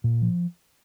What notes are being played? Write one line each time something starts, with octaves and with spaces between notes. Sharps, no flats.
A#2
F3